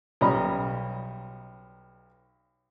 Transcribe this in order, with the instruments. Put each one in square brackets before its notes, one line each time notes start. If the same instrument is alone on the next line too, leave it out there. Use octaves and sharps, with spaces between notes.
[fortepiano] B1 G3 C#4 D#5 A#5 B5